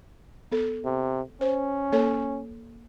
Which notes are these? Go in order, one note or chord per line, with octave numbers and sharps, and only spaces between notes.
B3 A4
C3
C#4 C5
A#3 A4 C#5